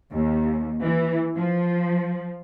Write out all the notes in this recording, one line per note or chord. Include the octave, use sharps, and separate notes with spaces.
D#2
E3
F3